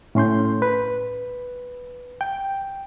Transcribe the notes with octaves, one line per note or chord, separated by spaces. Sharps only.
A2 C#4 C6 G6
B4
G5